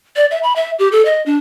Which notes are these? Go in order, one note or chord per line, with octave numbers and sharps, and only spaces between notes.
D5
E5
B5
E5
G4
A4
D#5
D4